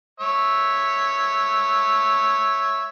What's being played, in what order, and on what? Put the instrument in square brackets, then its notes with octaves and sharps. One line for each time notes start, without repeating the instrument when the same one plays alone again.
[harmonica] C#5 E5